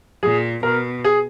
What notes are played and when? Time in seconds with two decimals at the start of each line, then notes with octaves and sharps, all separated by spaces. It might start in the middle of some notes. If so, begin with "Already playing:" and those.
0.23 A#2 G#4
0.63 B2 A#4
1.05 G#4